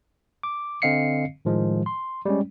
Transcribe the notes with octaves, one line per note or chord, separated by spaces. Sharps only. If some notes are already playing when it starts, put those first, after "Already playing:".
D6
D3 C4 D#5 F5 C7 C#7
A2 D#3 F3 G#3
C6
G3 G#3 C#4